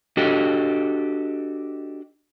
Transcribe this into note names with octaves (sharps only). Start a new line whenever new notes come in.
D4 F#4 G4 A4 D#5